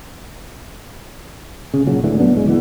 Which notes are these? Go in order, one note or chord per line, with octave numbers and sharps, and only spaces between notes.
C#3
A#2 C#3 F#3
D2 A2 D3 E3
F#3 B3 D4
C#2 G#3
E3 B3